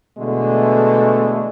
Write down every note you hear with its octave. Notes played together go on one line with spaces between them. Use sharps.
B2 D3 E3 G#3 A3